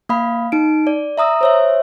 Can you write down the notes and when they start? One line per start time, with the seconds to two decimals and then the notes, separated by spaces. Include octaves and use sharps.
0.09 A#3 F5 B5
0.52 D#4 D7
0.87 D5
1.18 E5 A#5 D#6 E6
1.41 C5 C#5 E5